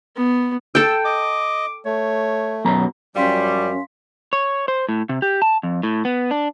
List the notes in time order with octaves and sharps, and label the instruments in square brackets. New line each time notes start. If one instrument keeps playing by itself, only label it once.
[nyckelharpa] B3
[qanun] A4 G5 [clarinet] E6
[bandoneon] D#5 [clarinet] D6
[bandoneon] A3 [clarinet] C#5
[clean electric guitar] F#2 B2 A#5
[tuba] F#2 [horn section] F3 G3 [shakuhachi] C#4 [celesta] F5 C6 B6
[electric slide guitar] C#5
C5
A2
C3
G4
A5
F2
A2
B3
D4